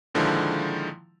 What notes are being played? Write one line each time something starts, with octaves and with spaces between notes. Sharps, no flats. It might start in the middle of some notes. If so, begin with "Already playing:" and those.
A#2 D3 D#3 F3 G#3 E4